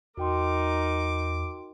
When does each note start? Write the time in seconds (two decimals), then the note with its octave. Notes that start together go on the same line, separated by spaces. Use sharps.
0.17 E2 D#4 F#4 A#4 G5 C6 D6